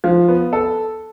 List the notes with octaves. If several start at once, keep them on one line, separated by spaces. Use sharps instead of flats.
F3
B3
A4